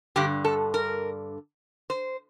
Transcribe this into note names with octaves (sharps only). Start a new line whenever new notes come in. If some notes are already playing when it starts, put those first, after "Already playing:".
G2 D3 G4
A4
A#4
C5